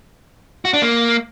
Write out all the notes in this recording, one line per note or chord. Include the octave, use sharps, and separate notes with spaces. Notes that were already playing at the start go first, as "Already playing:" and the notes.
F#4
D4
A#3